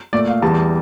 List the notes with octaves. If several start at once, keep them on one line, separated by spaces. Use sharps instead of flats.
A#2 A3 D5
F5
E2 E3 G3 A5